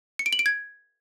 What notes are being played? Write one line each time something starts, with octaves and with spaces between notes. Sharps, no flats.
C#7
D7
F#7
D7
G#6